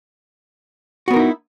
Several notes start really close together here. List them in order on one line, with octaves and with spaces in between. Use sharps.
F#4 B3 A#4 D#4 E4